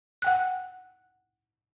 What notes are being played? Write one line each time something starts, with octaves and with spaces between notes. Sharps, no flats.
F#5 G5 F#6